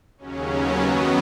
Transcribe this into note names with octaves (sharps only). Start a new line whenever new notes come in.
D#2 C#3 F#3 C#4
B3
F#2 D#3 F#3